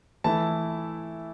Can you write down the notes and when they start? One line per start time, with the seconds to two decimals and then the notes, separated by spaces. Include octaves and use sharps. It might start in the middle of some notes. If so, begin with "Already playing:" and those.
0.24 E3 A3 E4 A5